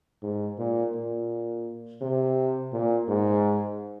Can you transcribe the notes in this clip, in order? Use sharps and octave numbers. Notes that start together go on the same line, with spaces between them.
G#2
A#2
A#2
C3
A#2
G#2